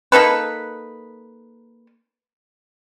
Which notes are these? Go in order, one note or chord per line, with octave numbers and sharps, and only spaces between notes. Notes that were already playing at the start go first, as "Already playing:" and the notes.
A#3 D#4 A4 B4